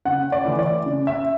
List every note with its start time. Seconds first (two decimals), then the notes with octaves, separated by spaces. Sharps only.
0.05 C#3 F#5
0.32 D5
0.45 E3 A3 E4
0.59 D5
0.86 C#3
1.07 E5